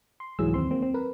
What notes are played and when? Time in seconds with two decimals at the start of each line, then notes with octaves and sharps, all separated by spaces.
0.20 C6
0.39 C2 G#2 E3 F#3 G#4 E6
0.54 D#2 C4 C6
0.70 F#3 A#3 C4
0.82 C4
0.94 A#4 B4